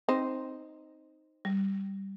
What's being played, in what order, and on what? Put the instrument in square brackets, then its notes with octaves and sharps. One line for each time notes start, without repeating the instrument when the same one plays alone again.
[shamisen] C4 D#4 C5
[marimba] G3